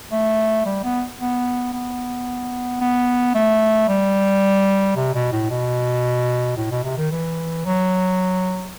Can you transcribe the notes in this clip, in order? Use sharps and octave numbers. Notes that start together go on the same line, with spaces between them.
A3
G3
B3
B3
B3
B3
A3
G3
C3
B2
A2
B2
A2
B2
C3
D#3
E3
F#3